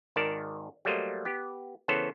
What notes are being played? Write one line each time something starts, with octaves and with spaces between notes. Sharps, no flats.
G#1 D#3 A#4 D5 A5
F#3 G3 A3 A#3 C5 D#5
B3 G4
C#3 E3 B3 A4 C5 C#5